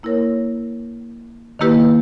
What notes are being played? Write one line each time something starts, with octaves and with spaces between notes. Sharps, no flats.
A#3 E4 A#4 C#5
D#3 A#3 E4 G4 B4